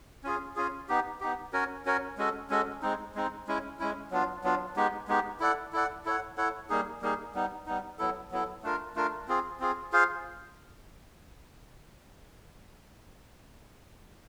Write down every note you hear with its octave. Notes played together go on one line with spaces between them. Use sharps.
C#4 F4 G#4
C#4 F4 G#4
B3 D#4 G4
B3 D#4 G4
C#4 F#4 A#4 C#5
C#4 F#4 A#4 C#5
G#3 C#4 F#4 A4
G#3 C#4 F#4 A4
G#3 C4 D#4
G#3 C4 D#4
G#3 C#4 E4
G#3 C#4 E4
F#3 B3 D4 F4
F#3 B3 D4 F4
G#3 B3 D#4 G4
G#3 B3 D#4 G4
E4 A4 D5 F#5
E4 A4 D5 F#5
E4 A4 C#5 F#5
E4 A4 C#5 F#5
G3 A#3 D#4 G#4
G3 A#3 D#4 G#4
G3 B3 D#4
G3 B3 D#4
F#3 B3 E4 A4
F#3 B3 E4 A4
A3 D4 F4 A#4
A3 D4 F4 A#4
C4 F4 G#4
C4 F4 G#4
F4 G#4 C5 F5